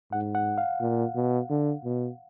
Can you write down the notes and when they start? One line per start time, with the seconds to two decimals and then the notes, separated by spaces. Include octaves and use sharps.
0.12 G#2 F#5
0.35 F#5
0.58 F5
0.81 A#2
1.16 B2
1.50 D3
1.85 B2